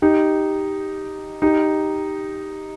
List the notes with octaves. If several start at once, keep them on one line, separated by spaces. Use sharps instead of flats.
D#4 G4
D#4 G4